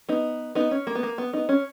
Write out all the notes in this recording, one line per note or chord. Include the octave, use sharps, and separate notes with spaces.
B3 D#4
B3 D#4
C#4
A#3
B3
A#3
B3
B3 D#4
C#4